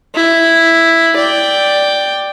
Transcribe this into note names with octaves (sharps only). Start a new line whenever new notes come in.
E4
D5 G5